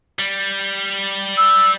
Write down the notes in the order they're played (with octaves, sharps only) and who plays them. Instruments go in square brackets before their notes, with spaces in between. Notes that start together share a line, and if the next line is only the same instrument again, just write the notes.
[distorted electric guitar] G3
[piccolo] E6